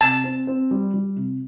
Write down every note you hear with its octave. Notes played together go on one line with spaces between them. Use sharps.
C3 A5
C4
C4
G3
G3
C3